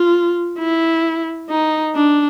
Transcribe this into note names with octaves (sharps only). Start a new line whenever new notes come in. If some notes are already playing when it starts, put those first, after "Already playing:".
Already playing: F4
E4
D#4
D4